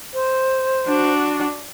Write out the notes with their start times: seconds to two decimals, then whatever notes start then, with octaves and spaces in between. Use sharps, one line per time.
0.13 C5
0.86 D4 F#4